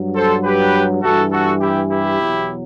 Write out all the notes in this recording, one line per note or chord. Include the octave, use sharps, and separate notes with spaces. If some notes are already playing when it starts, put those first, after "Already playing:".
Already playing: G2 F#3
A4 C5
G4 B4
G2 E3 F#4 A4
F#4 A4
E4 G4
E4 G4
E2 B2 F#3